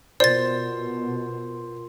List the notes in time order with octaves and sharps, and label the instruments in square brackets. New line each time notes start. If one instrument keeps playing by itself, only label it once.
[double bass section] B2 [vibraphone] F4 A#4 C6 [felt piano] C5 [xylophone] D5 A6